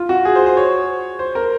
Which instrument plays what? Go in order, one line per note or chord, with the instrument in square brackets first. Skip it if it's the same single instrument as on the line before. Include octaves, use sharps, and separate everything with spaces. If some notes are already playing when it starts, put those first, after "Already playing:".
Already playing: [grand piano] F4
F#4
G#4
C5
C5
C#5
C5
A#4